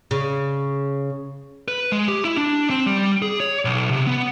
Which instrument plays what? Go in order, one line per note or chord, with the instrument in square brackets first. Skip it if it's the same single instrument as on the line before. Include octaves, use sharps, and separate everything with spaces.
[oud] C#3
[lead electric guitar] B4
G#3
G4
E4
D4
C4
G3
G#4
C#5
B1
C3
B3